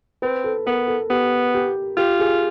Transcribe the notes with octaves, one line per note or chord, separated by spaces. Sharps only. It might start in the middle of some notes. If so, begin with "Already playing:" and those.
C4 B4
A4
B3 A#4
A4
B3 G4
G4
F4 G4
G#4